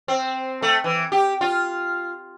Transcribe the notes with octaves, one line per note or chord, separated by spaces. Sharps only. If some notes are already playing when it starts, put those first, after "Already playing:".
C4
A3
E3
G4
F4